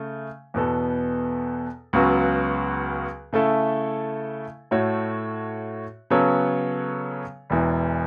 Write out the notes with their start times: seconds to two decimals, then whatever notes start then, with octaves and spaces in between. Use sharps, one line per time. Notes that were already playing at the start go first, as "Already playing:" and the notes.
Already playing: C#3 A3
0.54 E2 B2 B3 A4
1.93 C#2 C#3 F#3 B3 F#4
3.33 C#3 A3 E4 A4
4.71 A2 A3 F#4 C#5
6.10 C#3 F#3 B3 A4 C#5
7.50 E1 E2 E3